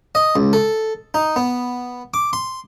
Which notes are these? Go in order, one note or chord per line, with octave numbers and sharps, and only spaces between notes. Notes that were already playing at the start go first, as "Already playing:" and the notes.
D#5
C#2
A4
D#4
B3
D6
C6